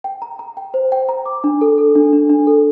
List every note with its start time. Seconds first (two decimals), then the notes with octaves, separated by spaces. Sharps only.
0.04 G5
0.22 A#5
0.39 A#5
0.57 G5
0.74 C5
0.92 G5
1.09 A#5
1.26 D6
1.44 D4
1.61 A4
1.78 A4
1.95 D4
2.13 D4
2.30 D4
2.47 A4